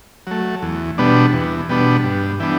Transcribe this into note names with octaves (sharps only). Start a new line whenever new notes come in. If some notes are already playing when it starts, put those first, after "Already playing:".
F#3 A3
E2
B2 G3 B3 D4
E2
B2 G3 B3 D4
G2
E3 G3 B3 D4